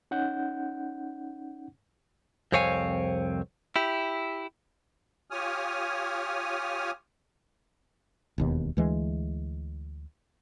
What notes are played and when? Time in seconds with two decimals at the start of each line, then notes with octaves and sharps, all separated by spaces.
0.11 C#4 D#4 F#5 G6
2.52 C2 F2 C4 C#5 F5 G#5
3.76 E4 G4
5.30 F4 G4 C#5 G#5 D#6 F6
8.38 E1 D#2 B2
8.77 D2 E3 G#3